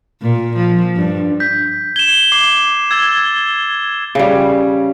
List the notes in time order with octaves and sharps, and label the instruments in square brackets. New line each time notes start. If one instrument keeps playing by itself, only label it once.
[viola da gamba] A#2
F3
G2
[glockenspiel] G6 B6
[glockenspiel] G#6 [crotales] E7 G7
[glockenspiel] D6 [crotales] C7
[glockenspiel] E6 A6 G7 [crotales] G#6
[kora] C#3 G3